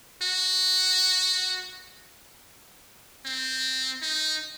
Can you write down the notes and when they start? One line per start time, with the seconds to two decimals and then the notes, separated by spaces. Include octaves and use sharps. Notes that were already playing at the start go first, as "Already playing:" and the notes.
0.22 F#4
3.25 C4
4.02 D#4